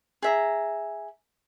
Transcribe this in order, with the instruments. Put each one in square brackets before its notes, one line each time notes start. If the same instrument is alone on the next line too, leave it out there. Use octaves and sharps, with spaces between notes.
[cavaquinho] G#4 E5 A#5